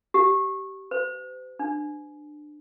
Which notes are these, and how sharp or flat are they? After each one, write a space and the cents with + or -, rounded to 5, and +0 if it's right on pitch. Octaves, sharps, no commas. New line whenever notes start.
G4 -25
C5 -45
D4 +25